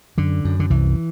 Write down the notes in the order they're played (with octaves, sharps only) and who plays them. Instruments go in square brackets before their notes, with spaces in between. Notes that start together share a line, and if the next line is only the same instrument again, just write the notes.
[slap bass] F#2 D3
F#2
D3
C2 E3